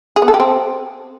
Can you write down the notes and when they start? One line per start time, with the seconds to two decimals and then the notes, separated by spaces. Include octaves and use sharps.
0.16 G#4
0.22 B3
0.28 A4
0.34 G4
0.40 C4